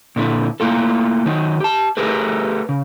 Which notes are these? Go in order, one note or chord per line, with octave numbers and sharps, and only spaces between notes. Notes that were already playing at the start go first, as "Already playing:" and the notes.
A#2 D3 E4
A3 A#3 E4 F4 A4
D#3 F#3 D#4
G4 A5
A3 G4 G#4 A#4 B4
C#3